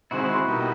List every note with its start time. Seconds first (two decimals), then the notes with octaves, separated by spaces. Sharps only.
0.11 C3 D#3 G#3 C4 E4 F#4
0.47 B2 G3 A#3 D#4